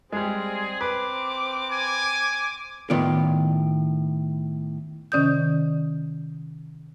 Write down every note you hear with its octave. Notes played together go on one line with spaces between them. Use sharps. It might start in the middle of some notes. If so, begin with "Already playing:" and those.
G3 G#3 C4 G#4
B4 D6
G#5
A2 D#3 B3 F4 D5
C3 D#3 C#4 D5 D#6 G6